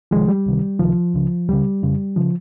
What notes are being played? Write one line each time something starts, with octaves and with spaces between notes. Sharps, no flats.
C2 C3 D#3 F3 G#3
G3
C#2 C3 D#3
C#2 C3 D#3 F3
C#2 C#3
C#2 C#3 G3
F2 C#3
C#3 F3